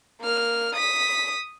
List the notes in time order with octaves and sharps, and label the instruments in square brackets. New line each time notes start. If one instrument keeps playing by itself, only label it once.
[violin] A#3 F6
D#6 B6